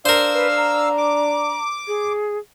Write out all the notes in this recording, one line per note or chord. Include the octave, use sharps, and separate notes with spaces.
D4 A#4 C5 F5 E6
B4
A#5
D6
G#4